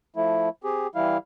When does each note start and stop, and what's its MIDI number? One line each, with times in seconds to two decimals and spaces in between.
0.16 0.49 53
0.16 0.49 57
0.16 0.49 64
0.64 0.87 60
0.64 0.87 67
0.64 0.87 68
0.95 1.17 52
0.95 1.17 55
0.95 1.17 64
0.95 1.17 77